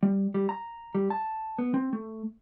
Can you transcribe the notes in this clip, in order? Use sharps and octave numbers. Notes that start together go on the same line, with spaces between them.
G3
G3
A#5
G3
A5
B3
C4
A3